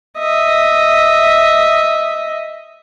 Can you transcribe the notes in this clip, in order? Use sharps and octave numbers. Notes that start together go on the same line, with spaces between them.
D#5 E5